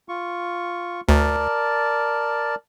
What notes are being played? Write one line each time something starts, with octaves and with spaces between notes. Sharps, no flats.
F4 C#6
D2 A#4 D5 A5